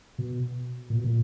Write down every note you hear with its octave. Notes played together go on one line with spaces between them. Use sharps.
B2
A#2
B2
A#2